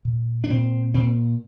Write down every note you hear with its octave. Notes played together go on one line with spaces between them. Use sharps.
A#2
D4
A#2 C4
A#2 C4